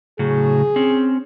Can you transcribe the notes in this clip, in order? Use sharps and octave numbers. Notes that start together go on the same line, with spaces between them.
A2 C#3 F#3 G#4
C4 C#4